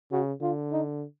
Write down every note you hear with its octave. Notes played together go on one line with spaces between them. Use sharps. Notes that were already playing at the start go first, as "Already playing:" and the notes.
C#3 F#4
D3 F4
D#4